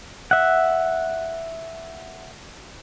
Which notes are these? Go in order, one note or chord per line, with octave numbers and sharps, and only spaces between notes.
E5 F#5